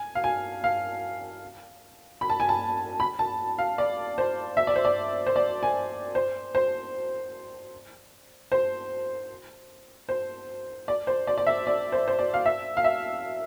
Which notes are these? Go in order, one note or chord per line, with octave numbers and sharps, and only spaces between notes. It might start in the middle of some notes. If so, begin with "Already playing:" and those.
Already playing: G#5
F5
G#5
F5
B5
A5
G#5
A5
B5
A5
F5
D5
C5
E5
D5
C5
D5
C5
D5
G#5
C5
C5
C5
C5
D5
C5
D5
D5
E5
D5
C5
C5
D5
F5
E5
F5
E5